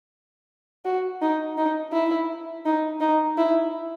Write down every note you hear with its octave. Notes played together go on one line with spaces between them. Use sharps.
F#4
D#4
D#4
E4
D#4
D#4
E4